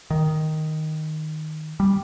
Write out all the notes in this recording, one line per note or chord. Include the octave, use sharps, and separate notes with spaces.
D#3
G3